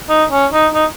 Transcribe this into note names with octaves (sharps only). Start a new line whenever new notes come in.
D#4
C#4
D#4
D#4